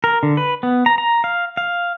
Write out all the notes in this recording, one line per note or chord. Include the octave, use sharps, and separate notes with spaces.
A#4
D3
B4
B3
A#5
A#5
F5
F5